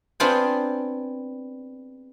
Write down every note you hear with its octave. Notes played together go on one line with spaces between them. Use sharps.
B3 C4 D4 F4 G#4 G5